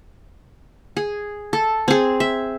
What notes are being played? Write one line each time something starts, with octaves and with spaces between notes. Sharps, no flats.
G#4
A4
C4 G#4
E5